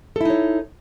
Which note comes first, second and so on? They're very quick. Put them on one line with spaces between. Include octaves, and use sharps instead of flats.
A4 E4 D#4 C#5